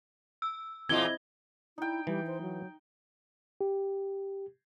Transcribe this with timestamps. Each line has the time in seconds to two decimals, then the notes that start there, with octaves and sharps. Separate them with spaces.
0.42 E6
0.89 E2 A#2 C4 E4 F4 D#5 G#6 G7
1.78 D#4 E4 G5
2.07 E3 G3
2.26 C5
2.41 F#3
3.61 G4